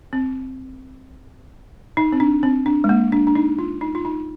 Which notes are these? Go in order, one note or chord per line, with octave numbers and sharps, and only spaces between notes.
C4
D#4
C4
D4
C4
D4
G#3
A#3
D4
D4
D#4
F4
D#4
F4
D#4